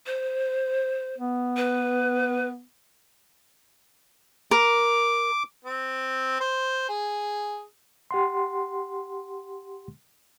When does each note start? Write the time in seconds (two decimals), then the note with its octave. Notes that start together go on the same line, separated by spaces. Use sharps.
0.06 C5
1.18 B3
1.57 B4
4.51 A#4 D6
5.64 C4
6.40 C5
6.89 G#4
8.11 G4 F#5 C6